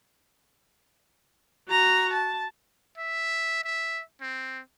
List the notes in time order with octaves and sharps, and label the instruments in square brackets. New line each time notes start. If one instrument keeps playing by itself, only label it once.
[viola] F#4 A#5
A5
[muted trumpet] E5
E5
C4